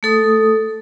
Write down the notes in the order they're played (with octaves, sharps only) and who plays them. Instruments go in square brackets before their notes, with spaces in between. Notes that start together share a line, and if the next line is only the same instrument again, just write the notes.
[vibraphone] A3 A4 D#6